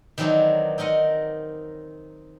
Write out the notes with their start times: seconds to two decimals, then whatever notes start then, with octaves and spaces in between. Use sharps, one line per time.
0.18 D#3 E3 F#3 C4 D4 D#4
0.78 C4 D#4 A#4 D#5 F#5